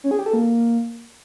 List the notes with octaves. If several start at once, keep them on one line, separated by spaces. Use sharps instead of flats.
C#4
G#4
G4
A4
A#3